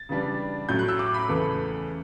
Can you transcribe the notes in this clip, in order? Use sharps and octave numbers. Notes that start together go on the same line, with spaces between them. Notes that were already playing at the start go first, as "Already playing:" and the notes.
Already playing: A6
C#3 E3 G3 D4
A2 F#3 C#4 G6
F#6
E6
D6
B5
E2 C#3 E3 A3